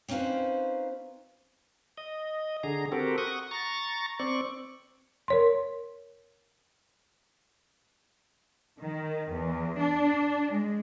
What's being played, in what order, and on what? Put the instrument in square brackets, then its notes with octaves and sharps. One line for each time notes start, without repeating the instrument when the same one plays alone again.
[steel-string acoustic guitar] C4 C#4 D#4 F4 B4 C5
[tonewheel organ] D#5
D3 G#4 A#5
C4 F#4 G4 A4 A#4
F#5 C#6 D#6
A#5 C#6 A6
C4 D5 C#6
[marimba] A#4 C#5 C6
[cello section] D#3
E2
D4
G#3